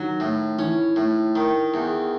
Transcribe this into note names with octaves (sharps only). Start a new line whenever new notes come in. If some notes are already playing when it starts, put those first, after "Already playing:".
Already playing: D#3 F#3
A2
E3 C#4
A2
D#3
E2